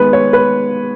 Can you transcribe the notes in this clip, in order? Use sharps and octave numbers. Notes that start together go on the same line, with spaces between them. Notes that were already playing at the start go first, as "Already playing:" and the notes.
Already playing: D#3 G#3 B3 B4
C#5
B4